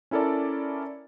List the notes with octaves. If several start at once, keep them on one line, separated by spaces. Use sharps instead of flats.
C#4 E4 A4 A#4 D5